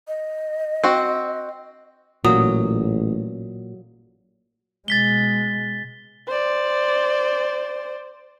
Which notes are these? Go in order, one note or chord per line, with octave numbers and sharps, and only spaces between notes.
D#5
C4 F#4
A1 A#2 F#3 D#6
B2 G#3 A6 B6 G7
C5 D5